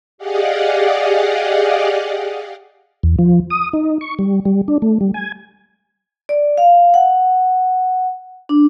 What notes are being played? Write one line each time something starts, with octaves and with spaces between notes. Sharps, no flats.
G4 G#4 D5 D#5 F5 F#5
E2
F3
D#6
D#4
C#6
G3
G3
D4
A3
G3
G#5
D5
F5
F#5
D4